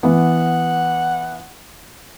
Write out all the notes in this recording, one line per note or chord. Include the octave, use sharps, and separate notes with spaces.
E3 B3 F#5